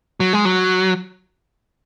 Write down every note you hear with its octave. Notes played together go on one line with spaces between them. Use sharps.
F#3
G#3
F#3